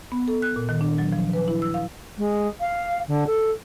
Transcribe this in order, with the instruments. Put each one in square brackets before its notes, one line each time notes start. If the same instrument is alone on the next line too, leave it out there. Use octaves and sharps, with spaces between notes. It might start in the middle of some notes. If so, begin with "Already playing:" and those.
[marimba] B3
A4
F#6
A#2
D#3
D4
F#3
F3
B4
E4
E6
F5
[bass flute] G#3
F5
D3
A4